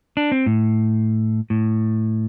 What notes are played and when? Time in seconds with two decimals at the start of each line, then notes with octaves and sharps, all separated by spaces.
0.17 D4
0.32 C4
0.46 A2
1.50 A2